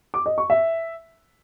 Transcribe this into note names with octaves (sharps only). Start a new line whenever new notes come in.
D6
D#5
C#6
E5